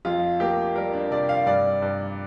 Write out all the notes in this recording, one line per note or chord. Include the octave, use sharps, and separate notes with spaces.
F2 F4
A#3 G4
G3 A#4
D4
C3 D5
F5
G2 D5
G2